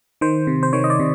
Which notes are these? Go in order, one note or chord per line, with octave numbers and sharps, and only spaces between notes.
D#3 C5
C3
C5
D#3 C#5
D#5
D5
C3